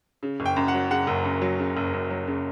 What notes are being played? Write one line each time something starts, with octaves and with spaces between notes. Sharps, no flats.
C#3
F#1
G5
F#2
F#5
F#3
C#3 F#5
F#1
F#2
F#3
C#3
F#1
F#2
F#3
C#3